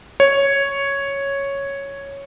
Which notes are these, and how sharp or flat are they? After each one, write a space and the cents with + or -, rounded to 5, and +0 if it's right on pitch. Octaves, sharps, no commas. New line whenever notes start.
C#5 +0